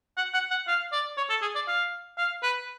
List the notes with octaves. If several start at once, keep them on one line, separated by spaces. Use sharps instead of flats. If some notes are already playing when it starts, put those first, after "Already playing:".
F#5
F#5
F#5
F5
D5
C#5
A4
G#4
D5
F5
F5
B4